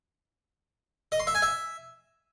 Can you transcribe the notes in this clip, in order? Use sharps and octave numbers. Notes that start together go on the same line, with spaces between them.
D#5
C6
E5
G#5
E5